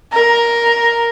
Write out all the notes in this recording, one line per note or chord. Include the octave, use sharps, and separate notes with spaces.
A#4